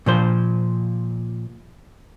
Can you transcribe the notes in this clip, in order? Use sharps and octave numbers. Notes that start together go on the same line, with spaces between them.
A#2 F3 C5